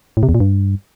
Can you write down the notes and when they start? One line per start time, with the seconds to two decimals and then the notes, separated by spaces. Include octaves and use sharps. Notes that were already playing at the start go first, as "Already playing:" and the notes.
0.17 A2
0.23 C3
0.29 E2
0.35 A#2
0.40 G2